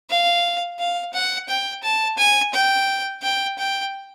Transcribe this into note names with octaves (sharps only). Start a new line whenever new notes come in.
F5
F5
F#5
G5
A5
G#5
G5
G5
G5